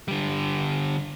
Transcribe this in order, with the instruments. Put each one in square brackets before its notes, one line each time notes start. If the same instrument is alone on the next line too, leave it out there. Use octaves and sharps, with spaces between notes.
[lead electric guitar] D3 G3